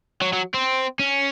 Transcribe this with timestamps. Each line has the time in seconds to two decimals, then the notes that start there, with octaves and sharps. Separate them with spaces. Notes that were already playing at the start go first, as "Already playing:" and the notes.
0.21 F#3
0.33 F#3
0.54 C4
0.99 C#4